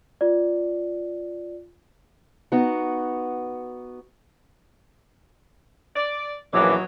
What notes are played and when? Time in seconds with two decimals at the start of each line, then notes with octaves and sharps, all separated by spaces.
0.21 F4 D5
2.52 B3 D#4 F#4 F#5
5.96 D5
6.53 A#1 F#2 B2 E3 F#3 D6